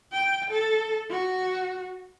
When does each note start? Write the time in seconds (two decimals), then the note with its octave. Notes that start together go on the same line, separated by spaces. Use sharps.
0.12 G5
0.50 A4
1.10 F#4